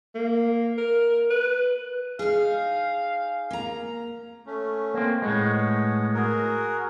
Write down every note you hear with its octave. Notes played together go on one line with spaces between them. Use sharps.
A#3
A#4
B4
D#4 G#4 F5
A#3 A#5
A3 C#4
A#3 C4
A2 G#3 B3 C#5
F#4 G#4 A#4